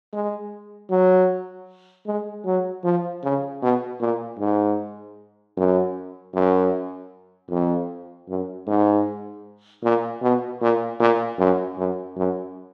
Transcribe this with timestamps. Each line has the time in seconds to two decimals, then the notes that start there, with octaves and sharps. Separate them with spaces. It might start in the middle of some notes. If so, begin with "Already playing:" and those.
0.13 G#3
0.90 F#3
2.06 G#3
2.46 F#3
2.84 F3
3.23 C#3
3.62 B2
4.00 A#2
4.39 G#2
5.57 F#2
6.34 F#2
7.50 F2
8.29 F#2
8.67 G#2
9.83 A#2
10.22 B2
10.62 A#2
11.00 A#2
11.39 F#2
11.77 F#2
12.16 F#2